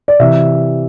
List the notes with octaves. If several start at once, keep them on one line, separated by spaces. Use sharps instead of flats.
D5
C3 E3 E5